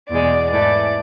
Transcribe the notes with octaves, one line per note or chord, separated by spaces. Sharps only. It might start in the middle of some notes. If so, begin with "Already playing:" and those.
E2 B2 G#3 D5
G#2 E3 A3 D5